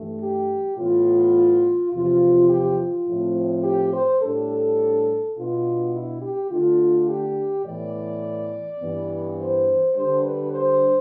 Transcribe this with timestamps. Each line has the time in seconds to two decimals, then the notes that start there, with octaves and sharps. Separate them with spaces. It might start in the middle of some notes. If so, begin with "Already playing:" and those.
Already playing: G2 E3 A3
0.21 G4
0.77 A2 E3 B3 F4
1.92 E2 C3 F3 F4
2.49 G4
2.79 F4
3.08 A2 F3 A3 C4
3.64 G4
3.93 C5
4.21 A2 G3 D4 A4
5.36 B2 B3 D4 F4
5.94 E4
6.22 G4
6.50 D3 A3 D4 F4
7.09 G4
7.65 A2 E3 B3 D5
8.80 G2 E3 B3
9.37 C5
9.95 D3 G3 D4 C5
10.23 B4
10.52 C5